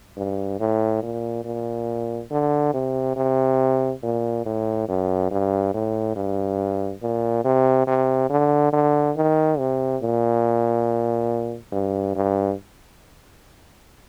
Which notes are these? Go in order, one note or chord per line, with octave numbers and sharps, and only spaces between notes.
G2
A2
A#2
A#2
D3
C3
C3
A#2
A2
F#2
G2
A2
G2
A#2
C3
C3
D3
D3
D#3
C3
A#2
G2
G2